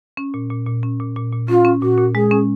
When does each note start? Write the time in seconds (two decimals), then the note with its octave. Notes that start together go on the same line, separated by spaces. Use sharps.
0.17 C#4
0.34 A#2
0.50 A#2
0.67 A#2
0.83 C#4
1.00 A#2
1.16 A#2
1.33 A#2
1.49 C#4 F4
1.65 C#4
1.82 A#2 F#4
1.98 A#2
2.15 G#3 G#4
2.31 C#4